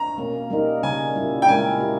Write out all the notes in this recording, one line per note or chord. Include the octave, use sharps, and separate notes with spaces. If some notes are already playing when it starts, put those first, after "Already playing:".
Already playing: A#5
B2 A#3 C#4
G3 A#3 D#4 A#4
C#3 G3 C#4 G#5
A#2 G3 A#3 E4
G5
A#2 G#3 C#4 E4 A#4 G#5
A#3 E4 G4